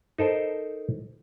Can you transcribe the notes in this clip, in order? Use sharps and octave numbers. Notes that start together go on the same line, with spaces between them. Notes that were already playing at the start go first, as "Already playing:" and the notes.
D#4 A4 A#4 C5